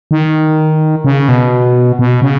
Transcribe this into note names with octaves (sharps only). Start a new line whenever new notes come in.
D#3
C#3
B2
B2
C#3